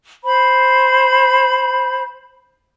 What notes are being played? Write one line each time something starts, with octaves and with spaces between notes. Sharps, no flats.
C5 B5